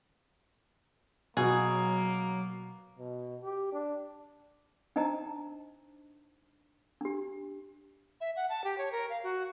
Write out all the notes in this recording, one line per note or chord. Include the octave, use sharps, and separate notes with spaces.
B2 F#3 A#3 G#4
B2
G4
D4
D4 D#4 C5 D#5 A5 A#5
D4 G4
E5
F#5
A5
G4
C#5
A#4
F5
F#4